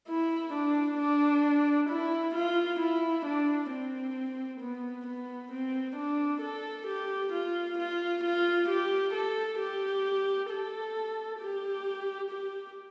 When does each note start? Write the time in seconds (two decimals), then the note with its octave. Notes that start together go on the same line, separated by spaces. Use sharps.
0.08 E4
0.53 D4
0.99 D4
1.90 E4
2.35 F4
2.80 E4
3.26 D4
3.71 C4
4.61 B3
5.07 B3
5.52 C4
5.96 D4
6.42 A4
6.87 G4
7.32 F4
7.79 F4
8.24 F4
8.69 G4
9.14 A4
9.60 G4
10.51 A4
11.40 G4
12.30 G4